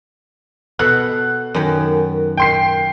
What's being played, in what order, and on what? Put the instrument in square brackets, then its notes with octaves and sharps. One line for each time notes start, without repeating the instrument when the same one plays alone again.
[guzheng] B2 A4 F#5 [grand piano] F#6
[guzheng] F#2 D#3
[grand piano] G5 C6 C7